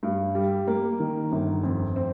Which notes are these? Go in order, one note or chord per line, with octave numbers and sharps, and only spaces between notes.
G2
G3
A#3
D#3
G1
F2
C4